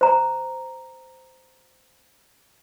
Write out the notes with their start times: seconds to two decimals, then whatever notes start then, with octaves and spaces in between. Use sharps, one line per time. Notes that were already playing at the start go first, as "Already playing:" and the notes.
0.01 C5 A#5